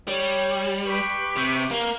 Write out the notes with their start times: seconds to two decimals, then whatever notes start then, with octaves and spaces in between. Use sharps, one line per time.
0.08 G3 C#5
0.85 G4 B4 C#6
1.36 C3
1.71 A#3